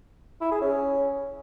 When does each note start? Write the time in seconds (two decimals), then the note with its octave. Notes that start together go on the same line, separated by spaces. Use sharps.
0.41 E4
0.51 G#4
0.61 C#4